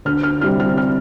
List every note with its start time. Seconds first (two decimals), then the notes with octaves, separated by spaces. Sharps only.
0.05 D2 F6
0.23 F6
0.41 C3 G3 C4 E4 F6
0.60 F6
0.77 F6